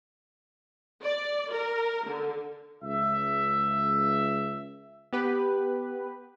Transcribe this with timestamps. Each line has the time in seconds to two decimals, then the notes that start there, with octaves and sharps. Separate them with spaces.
1.02 D5
1.51 A#4
2.06 D3
2.83 C#2 E5
5.13 B3 G4 B4